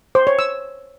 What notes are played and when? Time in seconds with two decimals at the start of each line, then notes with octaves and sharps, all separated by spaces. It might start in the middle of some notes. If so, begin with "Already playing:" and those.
0.15 C5
0.27 C#5
0.39 E6